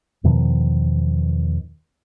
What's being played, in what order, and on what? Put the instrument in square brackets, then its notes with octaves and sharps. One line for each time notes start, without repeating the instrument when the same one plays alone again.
[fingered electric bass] E2 B2 D#3 F3